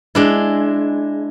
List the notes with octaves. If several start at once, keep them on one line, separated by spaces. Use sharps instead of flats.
G#3 D4 E4